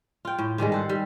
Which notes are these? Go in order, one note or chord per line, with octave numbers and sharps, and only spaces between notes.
F4 G5
A2
G#2 D#3 G3 G#3
A4 C5 F#5
G3